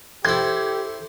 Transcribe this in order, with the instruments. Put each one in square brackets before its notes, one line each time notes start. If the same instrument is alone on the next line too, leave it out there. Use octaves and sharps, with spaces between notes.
[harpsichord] E4 C5 [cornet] G4 [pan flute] A4 [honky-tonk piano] G#6